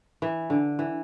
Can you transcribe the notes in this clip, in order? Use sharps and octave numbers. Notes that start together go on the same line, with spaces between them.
E3
D3
E3